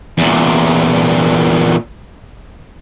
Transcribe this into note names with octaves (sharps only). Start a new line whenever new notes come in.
E2 A#2